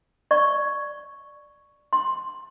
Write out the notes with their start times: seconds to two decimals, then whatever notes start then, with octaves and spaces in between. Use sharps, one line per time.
0.31 D5 C#6
1.93 C6